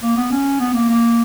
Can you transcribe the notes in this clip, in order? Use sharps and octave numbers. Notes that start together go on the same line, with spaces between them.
A#3
B3
C#4
B3
A#3
A#3